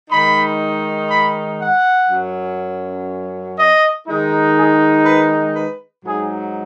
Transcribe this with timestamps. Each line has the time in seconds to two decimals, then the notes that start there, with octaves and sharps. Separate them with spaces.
0.10 D#3 G#3 D#4 B5
1.10 B5
1.59 F#5
2.08 F#2 F#3 C#4
3.57 D#5
4.07 D#3 G#3 D#4
4.56 G#4
5.05 B4
5.55 B4
6.04 G#2 F#3 D#4 G#4